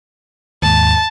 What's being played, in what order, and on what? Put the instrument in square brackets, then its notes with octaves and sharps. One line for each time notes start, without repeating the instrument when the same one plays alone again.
[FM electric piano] D#2 G#2 [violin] A5